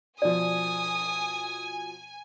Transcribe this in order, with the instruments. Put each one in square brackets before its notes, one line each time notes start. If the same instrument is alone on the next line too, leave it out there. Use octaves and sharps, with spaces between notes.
[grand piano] B2 F3 [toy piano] D5 [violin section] G#5 [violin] D#6